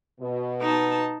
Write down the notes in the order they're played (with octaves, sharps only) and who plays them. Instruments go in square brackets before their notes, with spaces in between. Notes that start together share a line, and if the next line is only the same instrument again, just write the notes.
[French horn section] B2
[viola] D#4 A5